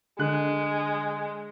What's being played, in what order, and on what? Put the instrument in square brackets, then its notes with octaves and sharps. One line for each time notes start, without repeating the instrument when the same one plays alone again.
[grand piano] D3 F#6 [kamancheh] G#3